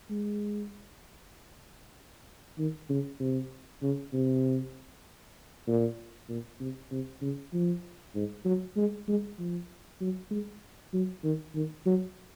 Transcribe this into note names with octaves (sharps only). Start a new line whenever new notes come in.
G#3
D#3
C#3
C3
C#3
C3
A#2
A#2
C3
C3
C#3
F3
G#2
F#3
G#3
G#3
F3
F#3
G#3
F#3
D#3
D#3
F#3